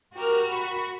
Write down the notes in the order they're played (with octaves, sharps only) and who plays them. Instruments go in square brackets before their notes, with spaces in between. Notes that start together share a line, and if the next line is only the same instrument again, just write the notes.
[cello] F#4 [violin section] G4 A#4 F6
[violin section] B5 C#6